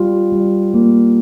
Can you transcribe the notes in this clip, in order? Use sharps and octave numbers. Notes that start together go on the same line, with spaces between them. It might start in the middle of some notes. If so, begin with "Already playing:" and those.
Already playing: G3 F4
G3
A#3